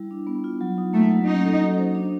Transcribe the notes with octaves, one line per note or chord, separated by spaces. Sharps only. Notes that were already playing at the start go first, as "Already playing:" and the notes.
Already playing: G3 E4
D4
B3
F4
F#3
D#4
A3 A#3
F#3
C#4 D#4
A4
F#4
C5
D4